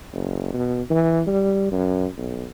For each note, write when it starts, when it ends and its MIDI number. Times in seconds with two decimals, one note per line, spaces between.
0.13 0.53 30
0.54 0.82 47
0.90 1.22 52
1.27 1.68 55
1.72 2.07 42
2.18 2.46 35